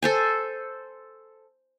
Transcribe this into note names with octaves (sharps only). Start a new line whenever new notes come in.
A4 C5 G#5